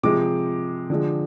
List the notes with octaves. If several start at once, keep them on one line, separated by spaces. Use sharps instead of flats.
C3 F3 G#3 D6
D3 F3 G#3